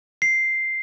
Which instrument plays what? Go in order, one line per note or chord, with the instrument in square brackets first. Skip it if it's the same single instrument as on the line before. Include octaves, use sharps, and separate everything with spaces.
[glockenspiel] C7